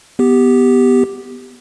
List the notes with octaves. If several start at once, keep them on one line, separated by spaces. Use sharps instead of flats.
B3 G4